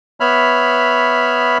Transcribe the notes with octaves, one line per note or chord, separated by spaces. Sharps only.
B3 C#5 E5 B5 F6